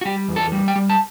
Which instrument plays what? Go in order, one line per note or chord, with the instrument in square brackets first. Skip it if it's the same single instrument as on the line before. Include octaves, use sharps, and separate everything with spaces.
[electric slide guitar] F#4
G3 G4
E2
A4
G3
G5
G3
A5